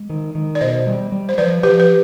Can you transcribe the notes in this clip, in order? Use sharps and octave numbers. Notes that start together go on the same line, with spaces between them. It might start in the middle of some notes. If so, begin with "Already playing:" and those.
Already playing: G#3
D#3
D#3
D5
B2 C5 D#5
G3
G3
C5
F3 B4 D5
F3 G4 B4
B4